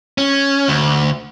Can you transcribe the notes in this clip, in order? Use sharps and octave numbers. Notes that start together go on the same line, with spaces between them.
C#4
D2